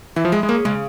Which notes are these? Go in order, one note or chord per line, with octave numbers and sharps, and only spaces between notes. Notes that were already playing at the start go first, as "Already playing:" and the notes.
E3 E4
F3
G#3 G#4
G#3
A#3 C#4
C#3 G#3